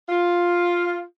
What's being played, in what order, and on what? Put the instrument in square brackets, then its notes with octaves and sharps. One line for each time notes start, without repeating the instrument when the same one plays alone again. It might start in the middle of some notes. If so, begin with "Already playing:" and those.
[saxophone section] F4